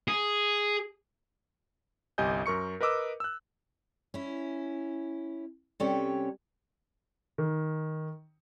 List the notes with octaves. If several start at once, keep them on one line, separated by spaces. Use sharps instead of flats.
G#4
G1 C2 G4 D#5 G#5 G6
F#2 A#4 C#6 C#7
A#4 B4 D#5 D6 E6
E6 F#6
C#4 E4
C3 G3 C#4 A4 C#5 G5
D#3